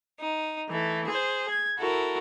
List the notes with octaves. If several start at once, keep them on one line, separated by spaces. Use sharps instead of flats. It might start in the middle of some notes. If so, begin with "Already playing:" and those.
D#4
E3 A3
G#4 C5
G#6
E4 F#4 A4 A#4